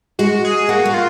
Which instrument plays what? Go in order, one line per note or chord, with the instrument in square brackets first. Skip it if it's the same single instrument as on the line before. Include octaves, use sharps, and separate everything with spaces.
[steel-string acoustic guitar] G#3 [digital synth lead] F#4
[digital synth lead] G#4
[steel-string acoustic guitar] A#3 [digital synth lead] F#4
[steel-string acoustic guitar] A#3
[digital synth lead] F4